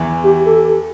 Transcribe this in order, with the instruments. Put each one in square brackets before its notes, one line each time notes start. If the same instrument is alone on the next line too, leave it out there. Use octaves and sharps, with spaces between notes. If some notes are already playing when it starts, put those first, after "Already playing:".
Already playing: [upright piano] E2 E3
[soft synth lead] G4
A4